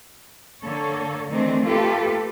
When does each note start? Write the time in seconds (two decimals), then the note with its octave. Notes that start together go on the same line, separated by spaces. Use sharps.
0.63 D3 A#3 A4 C#5
1.28 D#3 E3 A3 C4 D4
1.65 A3 A#3 F4 G4 A4 B4